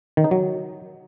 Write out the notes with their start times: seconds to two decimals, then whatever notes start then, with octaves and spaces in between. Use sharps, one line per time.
0.17 D#3
0.24 D#4
0.31 F#3